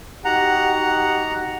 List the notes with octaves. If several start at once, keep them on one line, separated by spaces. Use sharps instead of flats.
D#4 F#4 G4 F#5 A#5